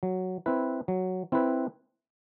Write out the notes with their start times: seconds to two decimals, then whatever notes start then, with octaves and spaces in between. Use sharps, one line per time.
0.03 F#3
0.46 C4 E4 B4
0.88 F#3
1.32 C4 E4 B4